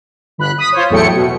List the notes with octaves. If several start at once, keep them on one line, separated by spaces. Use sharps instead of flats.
G1 B5 F#6
D#6 B6 D#7
F4 C5 C#5
E2 A2 F#3 A3 G5 C#7
B2